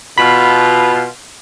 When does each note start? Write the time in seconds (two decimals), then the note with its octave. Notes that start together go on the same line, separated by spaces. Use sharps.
0.18 B2 F4 B5